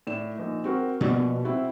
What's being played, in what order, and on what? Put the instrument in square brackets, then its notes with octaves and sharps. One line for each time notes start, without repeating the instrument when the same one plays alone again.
[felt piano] A2 D5 E7
A#1 D#4
C4 F#4 A#4
[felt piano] A#1 F#4 D5 [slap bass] B2 B3
[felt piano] C4 E4 F#4